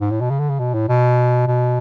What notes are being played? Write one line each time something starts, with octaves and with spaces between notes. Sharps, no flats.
G#2
A2
B2
C#3
D3
C#3
B2
A2
B2
B2